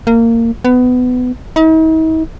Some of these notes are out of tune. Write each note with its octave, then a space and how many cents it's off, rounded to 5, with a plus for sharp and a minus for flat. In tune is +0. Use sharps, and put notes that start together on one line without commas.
A#3 -20
B3 +20
D#4 +45